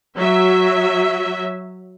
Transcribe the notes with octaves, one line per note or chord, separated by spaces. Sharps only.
F#3 E5